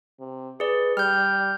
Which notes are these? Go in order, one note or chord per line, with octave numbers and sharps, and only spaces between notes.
C3
G#4 B4 D5
G3 F6 G6